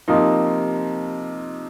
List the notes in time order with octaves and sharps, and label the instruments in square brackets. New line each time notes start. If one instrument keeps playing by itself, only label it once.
[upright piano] C3 F3 A#3 D#4